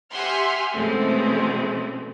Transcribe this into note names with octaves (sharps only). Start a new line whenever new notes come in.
G4 E5 F#5 G#5 C6 F6
B2 E3 G#3 A3 C4 C#4